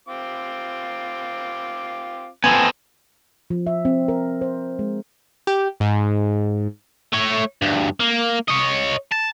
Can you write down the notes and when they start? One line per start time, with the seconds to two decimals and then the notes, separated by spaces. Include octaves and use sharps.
0.08 C4 F4 D6
2.44 B3 C4 A4 G#5
3.50 F3
3.67 E5
3.85 C4
4.08 A#4
4.41 C5
4.79 G#3
5.47 G4
5.80 G#2
7.13 A3 C#5
7.62 D2 G2
8.00 A#3
8.48 C#5 D#5
9.12 A5